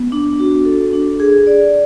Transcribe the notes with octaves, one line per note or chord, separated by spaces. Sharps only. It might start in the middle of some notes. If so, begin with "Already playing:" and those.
Already playing: B3
D4
F#4
A4
D4
G#4
D5